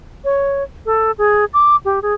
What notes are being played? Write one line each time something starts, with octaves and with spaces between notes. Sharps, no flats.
C#5
A4
G#4
D6
G4
G#4